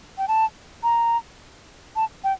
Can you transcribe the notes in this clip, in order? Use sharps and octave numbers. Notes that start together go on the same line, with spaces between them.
G5
A5
A#5
A5
G5